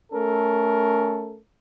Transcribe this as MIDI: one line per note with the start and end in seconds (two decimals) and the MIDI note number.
0.13 1.38 57
0.13 1.38 61
0.13 1.38 69
0.13 1.38 70